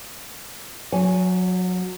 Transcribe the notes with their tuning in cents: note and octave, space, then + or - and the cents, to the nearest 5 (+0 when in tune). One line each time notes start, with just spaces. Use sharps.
F#3 -25 C#5 +35 G#5 +5